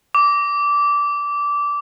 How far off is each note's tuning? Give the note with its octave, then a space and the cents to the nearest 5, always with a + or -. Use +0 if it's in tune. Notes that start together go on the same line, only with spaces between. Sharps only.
D6 -15